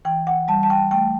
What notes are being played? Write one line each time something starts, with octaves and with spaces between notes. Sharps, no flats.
E3 G5
F#5
G3 A5
A5
G5
A3 G5